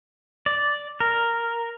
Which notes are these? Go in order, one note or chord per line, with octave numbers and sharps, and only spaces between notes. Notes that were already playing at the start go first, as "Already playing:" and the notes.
D5
A#4